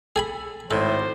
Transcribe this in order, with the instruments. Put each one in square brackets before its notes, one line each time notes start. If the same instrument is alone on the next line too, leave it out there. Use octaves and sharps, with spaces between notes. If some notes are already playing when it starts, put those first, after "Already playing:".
[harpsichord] G#4 G#5 B5 [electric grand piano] A4
[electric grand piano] G#1 [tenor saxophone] A2 [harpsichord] A4 [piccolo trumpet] C5